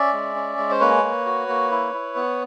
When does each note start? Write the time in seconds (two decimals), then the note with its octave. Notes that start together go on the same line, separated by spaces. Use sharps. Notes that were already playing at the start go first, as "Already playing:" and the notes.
Already playing: C#4 D5 E5
0.12 G#3
0.36 C#4
0.58 G#3
0.71 C5
0.80 A#3 B4 C#5
1.03 A#3
1.26 F#4
1.48 A#3
1.71 E4
1.93 E4
2.16 B3